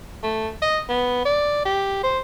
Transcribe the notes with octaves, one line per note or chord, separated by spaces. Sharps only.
A3
D#5
B3
D5
G4
C5